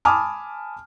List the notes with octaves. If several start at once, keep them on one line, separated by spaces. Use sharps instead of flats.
G#5 A5 B5 D6 D#6 F6